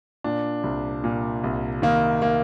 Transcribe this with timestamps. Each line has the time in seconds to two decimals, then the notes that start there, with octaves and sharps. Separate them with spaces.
0.24 A#2 D4
0.63 C2
1.04 A#2
1.44 C2
1.82 D#3 A#3
2.22 A#3